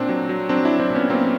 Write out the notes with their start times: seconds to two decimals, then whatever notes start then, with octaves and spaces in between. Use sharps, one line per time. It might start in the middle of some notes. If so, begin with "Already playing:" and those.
Already playing: A#2 C4 D4
0.09 F#3
0.29 F#3
0.49 F#3 C4 D4
0.65 F#3 D4 E4
0.80 C4 D4
0.90 A#2
0.95 B3 C#4
1.10 F#3 A#3 C4